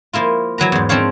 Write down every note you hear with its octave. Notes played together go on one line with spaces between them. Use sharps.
F3 A#3 E4 F4
E3 F#3 B4 A#5
E2 G#2
F3 C4 D4 C#5 F5